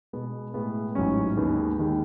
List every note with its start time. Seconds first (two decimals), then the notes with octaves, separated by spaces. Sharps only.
0.13 B2 G#3 B3
0.54 A2 G#3 B3
0.95 A1 G#2 F#3 C#4
1.37 D#2 D#3 G#3 B3
1.79 D#2 D#3 G#3